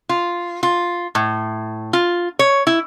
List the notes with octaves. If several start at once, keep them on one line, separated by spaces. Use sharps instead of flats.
F4
F4
A2
F4
C#5
E4